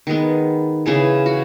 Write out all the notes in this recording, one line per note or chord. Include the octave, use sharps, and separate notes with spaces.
D#3 G#3 B3
C#3 E3 B3 G#4
F#4